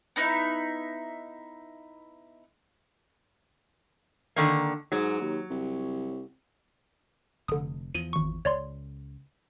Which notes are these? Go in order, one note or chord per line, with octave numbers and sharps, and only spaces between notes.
B3 D#4 E4 E5
D3 D#3 A#3
G#2 F#3
D#2
C2
F1 D3 D#6
E2 F3 D#7
G#1 C#6
C#2 C#5 D5 C6